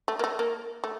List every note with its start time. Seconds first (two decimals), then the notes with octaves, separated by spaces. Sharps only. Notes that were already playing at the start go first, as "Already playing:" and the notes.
0.08 A3
0.19 A#3
0.24 A3
0.39 A#3
0.84 A3